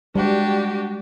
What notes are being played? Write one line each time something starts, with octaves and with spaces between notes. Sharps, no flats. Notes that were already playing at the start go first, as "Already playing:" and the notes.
G3 G#3 D4 F#4 G4